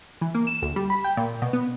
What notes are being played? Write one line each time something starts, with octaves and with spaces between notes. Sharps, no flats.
E3
A#3
E7
D2
G3
B5
G5
A#2
B2
B3